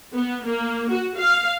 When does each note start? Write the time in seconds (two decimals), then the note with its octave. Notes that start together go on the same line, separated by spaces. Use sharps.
0.15 B3
0.45 A#3
0.90 F#4
1.19 F5